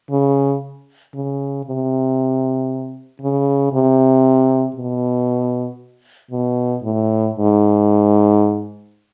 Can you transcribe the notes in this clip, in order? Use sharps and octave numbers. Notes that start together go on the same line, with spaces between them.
C#3
C#3
C3
C#3
C3
B2
B2
A2
G#2